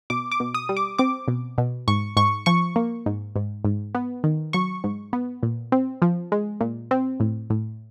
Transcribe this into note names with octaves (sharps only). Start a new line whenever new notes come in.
B2 D6
D6
B2
D#6
G3
D6
C4 D6
B2
B2
G#2 C#6
G#2 C#6
F3 C#6
A#3
G#2
G#2
G#2
B3
D#3
F#3 C#6
G#2
B3
A#2
C4
F3
G#3
A#2
C4
A2
A2